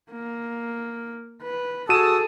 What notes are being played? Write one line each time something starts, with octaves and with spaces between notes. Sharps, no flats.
A#3
B4
F#4 G#4 A4 A5 D#6 E6 D#7 E7